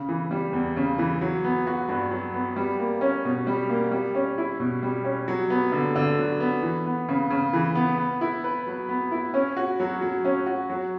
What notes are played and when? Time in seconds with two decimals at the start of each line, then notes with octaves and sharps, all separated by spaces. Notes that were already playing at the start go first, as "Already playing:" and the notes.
Already playing: C#3
0.09 E3
0.31 G3
0.53 E2
0.77 C#3
0.98 E3
1.21 F#3
1.44 B3
1.67 F#4
1.89 G2
2.11 F#3
2.34 B3
2.56 G3
2.79 A#3
3.01 C#4
3.25 B2
3.47 G3
3.70 A#3
3.91 G3
4.15 C#4
4.38 E4
4.60 B2
4.83 G3
5.04 C#4
5.28 F#3
5.50 B3
5.72 D3
5.95 D3
6.18 F#3
6.40 B3
6.62 E3
6.86 B3
7.09 C#3
7.30 C#3
7.53 E3
7.75 B3
7.98 B3
8.21 E4
8.44 B4
8.67 F#3
8.89 B3
9.11 E4
9.34 C#4
9.57 F#4
9.80 F#3
10.01 F#3
10.25 C#4
10.46 F#4
10.70 F#3